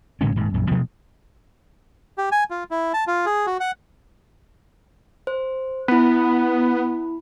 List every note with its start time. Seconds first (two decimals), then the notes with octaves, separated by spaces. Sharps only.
0.21 A2 D3 G#3 C#4
0.36 D#1 G#2
0.54 A#1 F#2
0.71 B2 F3 F#3 A3
2.18 G4
2.32 G#5
2.50 F4
2.71 E4
2.94 A5
3.07 F4
3.26 G#4
3.47 F#4
3.60 F#5
5.27 C5
5.88 B3 E4 B5